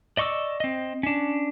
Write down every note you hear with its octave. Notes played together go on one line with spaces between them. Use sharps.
D5 D#5 C#6 D6 E6
C4 D#5
C#4 D4